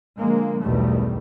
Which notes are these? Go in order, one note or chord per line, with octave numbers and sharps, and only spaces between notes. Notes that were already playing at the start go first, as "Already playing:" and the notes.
D3 F3 G#3 A#3
B1 E2 G2 D#3 G3 A3